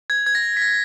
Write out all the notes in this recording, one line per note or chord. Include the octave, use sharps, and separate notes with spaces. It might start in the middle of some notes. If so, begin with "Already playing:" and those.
G#6
G#6
A#6
B6
A#6